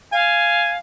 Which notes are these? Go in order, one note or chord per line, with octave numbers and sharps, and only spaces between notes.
F5 G#5